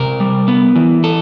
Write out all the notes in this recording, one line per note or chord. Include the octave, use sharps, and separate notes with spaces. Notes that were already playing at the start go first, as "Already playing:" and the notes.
Already playing: C3 A#4
G3
B3
E3
A4